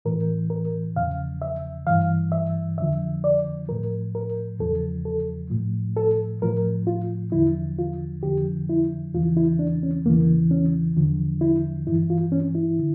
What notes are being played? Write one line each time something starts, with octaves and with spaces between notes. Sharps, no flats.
A2 E3 A#4
A#4
E2 C#3 F3 F5
E5
G2 E3 F5
E5
F2 D3 F3 E5
D5
A2 F3 A#4
A#4
E2 C#3 F3 A4
A4
A2 F3
A4
A2 F3 A#4
F4
E2 D3 F3 E4
F4
F2 D3 F3 G4
E4
E2 C#3 E3 F4
E4
D4
C#4
E2 C#3 E3 A#3
C#4
E2 D3 F3
E4
G2 E3 E4
F4
C#4
E4
D3